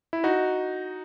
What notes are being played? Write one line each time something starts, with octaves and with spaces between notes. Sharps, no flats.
E4
D#4 F#4